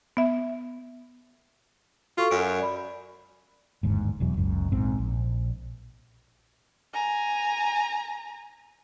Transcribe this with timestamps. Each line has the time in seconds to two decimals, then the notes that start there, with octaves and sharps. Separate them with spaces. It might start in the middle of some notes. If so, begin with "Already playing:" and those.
0.17 B3 E5
2.17 F4 F#4 A4 C#6
2.31 F#2 D7
2.59 D5 B5
3.83 G1 D#2 G#2
4.20 E1 E2 F#3
4.37 F#1 C#2 F#2
4.72 A#1 G#2 C4
4.98 A#1
6.93 G#5 A#5